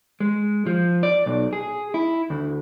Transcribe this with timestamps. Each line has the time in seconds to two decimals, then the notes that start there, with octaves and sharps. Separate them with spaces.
0.20 G#3
0.67 F3
1.03 D5
1.26 B1
1.53 G#4
1.94 E4
2.30 D2